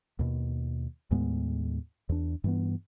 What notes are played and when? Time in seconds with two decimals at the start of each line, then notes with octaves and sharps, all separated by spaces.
0.19 D#2 B2
1.11 D#2 A2 G#3 B3
2.09 E2 D4
2.44 G2 E3 B3